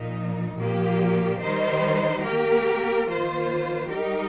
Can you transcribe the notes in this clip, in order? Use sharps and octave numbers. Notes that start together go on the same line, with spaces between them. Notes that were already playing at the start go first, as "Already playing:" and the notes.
Already playing: A#2 F3 D#4
A#2 F3 A#3 G4
D#3 G3 D#4 C5
A#3 G4 A#4
D#3 A#3 F4 C5
G3 D#4 G4 A#4